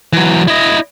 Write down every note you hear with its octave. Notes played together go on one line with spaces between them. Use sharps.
E3 F#3
E4 D#5